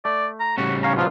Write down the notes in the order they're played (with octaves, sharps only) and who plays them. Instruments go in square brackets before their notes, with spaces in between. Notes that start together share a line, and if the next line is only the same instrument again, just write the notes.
[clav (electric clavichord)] A3 [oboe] D5
[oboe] A#5
[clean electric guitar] A2 C#3 G3 [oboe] F#4
[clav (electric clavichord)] C#4 F5 A#5 [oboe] C#5
[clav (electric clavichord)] B2 F3 F#3 [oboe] F4